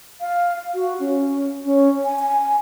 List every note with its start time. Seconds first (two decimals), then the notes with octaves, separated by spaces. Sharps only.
0.21 F5
0.74 F#4
1.00 C#4
1.65 C#4
2.04 G#5
2.19 G#5